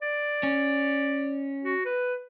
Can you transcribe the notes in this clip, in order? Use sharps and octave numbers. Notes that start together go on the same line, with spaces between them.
D5
C#4
F#4
B4